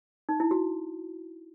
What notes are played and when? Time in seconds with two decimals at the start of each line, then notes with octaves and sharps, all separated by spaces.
0.29 D#4
0.40 E4
0.51 F#4